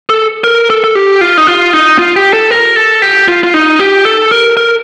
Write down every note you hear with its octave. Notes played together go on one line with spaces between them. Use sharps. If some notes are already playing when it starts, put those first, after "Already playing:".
A4
A#4
A4
A4
G4
F4
D#4
F4
D#4
F4
G4
A4
A#4
A4
G4
F4
F4
D#4
G4
A4
A#4
A#4